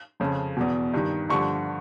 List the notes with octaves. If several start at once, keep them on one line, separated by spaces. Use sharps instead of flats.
F2 C#3 F3
E2 B2
G2 D#3
G2 D3 F3 C#6